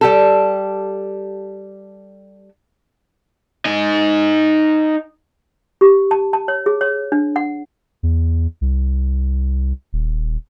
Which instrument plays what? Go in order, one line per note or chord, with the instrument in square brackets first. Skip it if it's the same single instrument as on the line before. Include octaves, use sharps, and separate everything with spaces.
[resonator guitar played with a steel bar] G3 G4 A4
[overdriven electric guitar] D#4 G#5
[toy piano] G4
A5
A5
C#5
G#4
C#5
D4
F#5
[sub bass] E2
C2
D#1